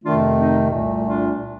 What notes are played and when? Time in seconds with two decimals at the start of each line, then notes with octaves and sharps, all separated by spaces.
0.03 F2 C3 D#3 A3 D4 F4
0.36 C4 D#4
0.69 C2 A#2 A3
1.03 D4 F4